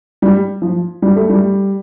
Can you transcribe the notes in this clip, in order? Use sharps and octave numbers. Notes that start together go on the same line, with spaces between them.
G3
F3
G3
A3
G3